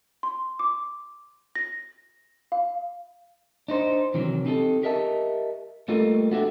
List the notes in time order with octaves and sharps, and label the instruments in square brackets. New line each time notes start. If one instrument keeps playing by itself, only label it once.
[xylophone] C6
D6
A#6
F5
[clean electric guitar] D4 D#4 C5
C3 D#3 E3 F#3
C4 D#4 G4 A4
G4 A#4 D#5 E5 A5
G3 A3 A#3 D#4 F4 A4
B3 D4 F#4 G4 A4 E5